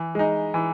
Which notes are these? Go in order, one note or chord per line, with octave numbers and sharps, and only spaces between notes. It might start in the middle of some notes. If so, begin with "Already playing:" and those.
Already playing: E3
G#3 D#4
E3